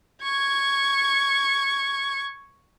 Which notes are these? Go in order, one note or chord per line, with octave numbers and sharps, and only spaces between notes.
C#6 G#6